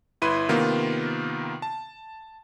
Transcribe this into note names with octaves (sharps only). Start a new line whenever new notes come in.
G1 E4 B4 C6 D#7
C3 D#3 A#3 B3 F4
A5